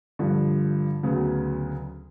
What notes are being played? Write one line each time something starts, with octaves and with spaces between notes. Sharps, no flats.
G2 D3 F3
D2 C#3 F#3 B3